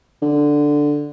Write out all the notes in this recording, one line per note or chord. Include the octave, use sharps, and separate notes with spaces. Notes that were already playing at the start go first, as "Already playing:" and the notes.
D3